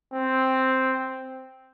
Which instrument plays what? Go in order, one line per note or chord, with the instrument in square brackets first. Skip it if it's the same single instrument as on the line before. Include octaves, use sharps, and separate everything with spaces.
[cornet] C4